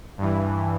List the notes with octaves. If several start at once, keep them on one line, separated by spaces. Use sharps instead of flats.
G2 E3